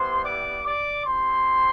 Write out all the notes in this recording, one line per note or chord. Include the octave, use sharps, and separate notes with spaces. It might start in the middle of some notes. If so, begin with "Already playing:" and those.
Already playing: G3 B3 E4 G4 C5 C6
D5 D6
D5 D6
C4 E4 G4 C5 C6